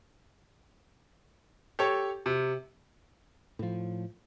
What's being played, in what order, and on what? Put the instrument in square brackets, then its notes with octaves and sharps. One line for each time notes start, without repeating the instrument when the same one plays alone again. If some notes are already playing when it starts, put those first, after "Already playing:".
[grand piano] G4 A4 C#5
C3
[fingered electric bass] A2 F3